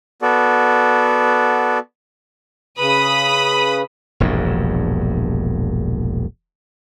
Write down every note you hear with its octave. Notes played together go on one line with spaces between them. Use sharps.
B3 F#4 A4 D5
C#3 B4 B5 D#6
E1 A#1 E2 G2